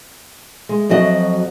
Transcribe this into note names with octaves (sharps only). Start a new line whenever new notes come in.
G#3
F2 F#3 F#4 D#5